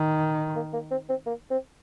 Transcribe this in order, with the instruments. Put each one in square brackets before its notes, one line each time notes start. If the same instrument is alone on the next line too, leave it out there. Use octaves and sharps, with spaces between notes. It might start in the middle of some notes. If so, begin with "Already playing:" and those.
Already playing: [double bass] D#3
[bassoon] A#3
A#3
C4
C4
A#3
C4